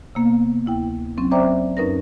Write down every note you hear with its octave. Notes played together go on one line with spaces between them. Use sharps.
C3 A#3 B3
D2 E4 G5
F#3 C4 C#4
C5 D5 E5 G5 A#5 D6
F#2 C#4 D#4 A#4 B4 A#6